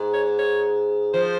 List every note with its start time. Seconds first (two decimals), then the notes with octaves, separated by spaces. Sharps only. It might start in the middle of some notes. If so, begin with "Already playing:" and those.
Already playing: G#2
0.13 C#5
0.39 C#5
1.14 F3 C5